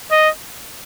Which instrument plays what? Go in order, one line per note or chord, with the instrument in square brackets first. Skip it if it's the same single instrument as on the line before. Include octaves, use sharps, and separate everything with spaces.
[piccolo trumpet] D#5